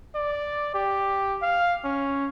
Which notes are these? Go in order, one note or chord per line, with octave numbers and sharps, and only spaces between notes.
D5
G4
F5
C#4